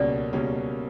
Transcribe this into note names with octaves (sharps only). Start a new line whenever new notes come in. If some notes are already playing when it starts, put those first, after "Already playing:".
Already playing: C#2 B2 G3 A#3 C#4 D5
C#2 B2 G3 A#3 C#4